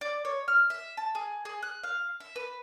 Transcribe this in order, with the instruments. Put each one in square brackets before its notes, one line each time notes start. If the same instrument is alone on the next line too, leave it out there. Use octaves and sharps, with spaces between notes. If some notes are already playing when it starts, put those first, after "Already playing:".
[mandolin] D5
C#5
F6
E5
A5
G#4
G#4
F#6
F5
E5
B4